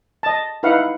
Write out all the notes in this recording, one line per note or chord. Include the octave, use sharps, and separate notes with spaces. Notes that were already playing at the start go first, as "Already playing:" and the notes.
D#5 A5
D#4 E4 B4 F5 F#5